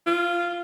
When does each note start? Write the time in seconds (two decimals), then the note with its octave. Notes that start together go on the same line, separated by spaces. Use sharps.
0.07 F4